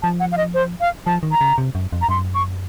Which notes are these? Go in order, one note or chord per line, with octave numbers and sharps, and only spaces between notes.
F3 A5
F#5
F5
D#5
C5
F5
F3 A5
D#3
A#5
C#3
C3
F#2
F2
A#5
F#2 C6
C#6